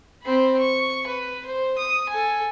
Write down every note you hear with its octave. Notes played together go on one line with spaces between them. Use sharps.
C4 B5
C#6
B4
C5
D#6
A4 G#5